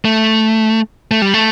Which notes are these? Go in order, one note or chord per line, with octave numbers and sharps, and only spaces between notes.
A3
A3
G3
A3